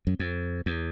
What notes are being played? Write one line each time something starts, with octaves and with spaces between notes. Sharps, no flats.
F#2
F2
E2